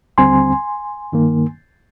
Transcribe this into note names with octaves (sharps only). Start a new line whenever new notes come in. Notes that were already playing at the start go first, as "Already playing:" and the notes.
D#2 D3 G3 C4 G#5 C6
G2 D#3 A#3